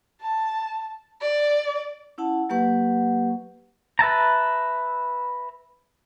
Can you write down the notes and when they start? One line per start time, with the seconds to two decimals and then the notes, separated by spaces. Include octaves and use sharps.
0.22 A5
1.21 D5
2.18 C#4 E4 F#5 A5
2.49 F#3 A#3 G4 B4 F#5 C#6
3.99 B4 E5 A5 A#5